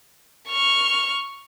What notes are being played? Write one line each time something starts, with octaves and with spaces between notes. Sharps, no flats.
C#6 F6